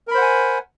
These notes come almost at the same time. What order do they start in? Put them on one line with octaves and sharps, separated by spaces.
A#4 B5 C5 F#5 G#5